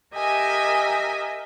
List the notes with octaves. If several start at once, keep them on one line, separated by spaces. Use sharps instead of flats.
G4 A#4 D#5 E5 G#5